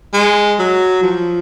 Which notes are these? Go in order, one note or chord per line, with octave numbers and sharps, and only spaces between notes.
G#3
F#3
F3